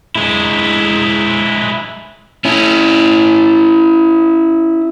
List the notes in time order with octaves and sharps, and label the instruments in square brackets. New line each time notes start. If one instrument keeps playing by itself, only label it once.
[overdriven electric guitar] G#3 E4
C#4 E4